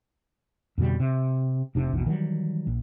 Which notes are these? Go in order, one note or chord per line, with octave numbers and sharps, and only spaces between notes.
F2 B2 D3 G3
C3
F1 C3 D4
A#1 E2 B2
D#3 E3 F#3 G3
A#1